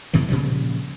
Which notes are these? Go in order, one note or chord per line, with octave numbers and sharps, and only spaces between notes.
F#2 B2 D#3 E3
A#2 C#3 F3 G3